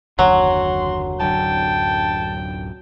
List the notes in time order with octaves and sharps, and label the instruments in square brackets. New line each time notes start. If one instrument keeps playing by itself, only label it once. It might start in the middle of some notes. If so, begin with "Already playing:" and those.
[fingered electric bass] F#1 D#2 D3 [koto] F#3 [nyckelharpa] F#4 [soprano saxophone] C6
[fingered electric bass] D1 F#2 D3 [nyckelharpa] G5 [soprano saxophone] A5